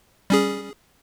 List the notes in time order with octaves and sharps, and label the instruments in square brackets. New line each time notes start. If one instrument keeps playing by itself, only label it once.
[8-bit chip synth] G3 C#4 G#4